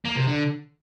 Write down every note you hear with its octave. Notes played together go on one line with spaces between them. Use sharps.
A#3
C3
D3